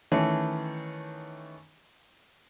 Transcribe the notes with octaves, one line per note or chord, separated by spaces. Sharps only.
D#3 E3 A3 C#4